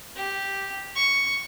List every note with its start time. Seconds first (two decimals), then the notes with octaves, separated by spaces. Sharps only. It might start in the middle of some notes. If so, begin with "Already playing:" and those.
0.16 G4
0.96 C#6